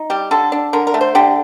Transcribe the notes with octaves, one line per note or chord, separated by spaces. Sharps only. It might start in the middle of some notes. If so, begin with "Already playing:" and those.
Already playing: D#4
G3 G4
D3 A4
D4
D3 A#4
A#4
A3
C5
D3 G4